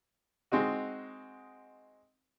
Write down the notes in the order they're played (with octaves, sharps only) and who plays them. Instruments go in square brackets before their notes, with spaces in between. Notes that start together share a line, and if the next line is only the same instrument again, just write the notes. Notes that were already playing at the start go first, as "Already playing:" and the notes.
[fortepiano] G#3 C4 D#4 F#4